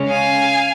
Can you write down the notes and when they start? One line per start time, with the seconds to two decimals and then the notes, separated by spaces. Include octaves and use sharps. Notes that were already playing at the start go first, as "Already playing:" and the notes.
Already playing: C#3 G#3 C#4
0.09 F5 G#5